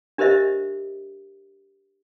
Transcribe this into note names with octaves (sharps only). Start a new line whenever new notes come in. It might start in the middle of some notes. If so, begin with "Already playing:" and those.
D4 G4 A#4 C5 D#5 E5